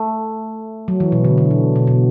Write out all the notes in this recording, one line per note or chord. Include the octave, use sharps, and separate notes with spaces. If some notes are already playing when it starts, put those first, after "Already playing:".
Already playing: A3
F#3
E3
B2
D3
D3
B2
B2
B2